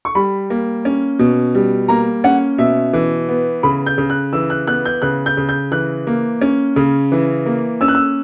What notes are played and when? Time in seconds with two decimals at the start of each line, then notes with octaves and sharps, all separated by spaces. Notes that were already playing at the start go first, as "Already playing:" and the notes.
0.05 C#6
0.15 G3 B5
0.50 A#3
0.85 C#4
1.19 B2
1.55 G3
1.88 A#3 A#5
2.24 C#4 F#5
2.58 B2 E5
2.93 E3
3.29 B3
3.63 C#3 B5
3.86 G6
3.98 C#3
4.10 F#6
4.33 E3 E6
4.50 F#6
4.67 B3 F#6
4.85 G6
5.02 C#3 F#6
5.26 G6
5.37 C#3
5.49 G6
5.72 E3 F#6
6.07 A#3
6.41 C#4
6.76 C#3
7.12 E3
7.46 A#3
7.81 C#4 E6
7.88 F#6
7.95 E6